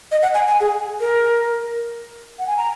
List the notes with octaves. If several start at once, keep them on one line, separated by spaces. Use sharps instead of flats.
D#5
F#5
G#5
G#5
G#4
A#4
F#5
G#5
A#5